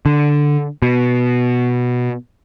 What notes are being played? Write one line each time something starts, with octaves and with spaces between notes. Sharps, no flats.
D3
B2